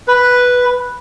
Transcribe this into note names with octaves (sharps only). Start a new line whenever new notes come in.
B4